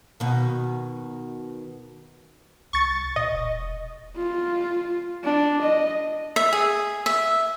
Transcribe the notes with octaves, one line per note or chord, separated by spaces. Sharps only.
B2 D#3
C2 C#6 A6
A#2 D#5
E1
F4
D4
D#5
E5
G#4
E5